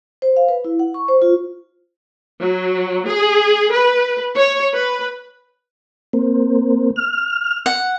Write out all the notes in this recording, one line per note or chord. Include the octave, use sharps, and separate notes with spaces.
C5
F5
B4
E4
F#5
C#6
C5
F4
F#3
G#4
B4
C#5
B4
A#3 C4
F6
F#5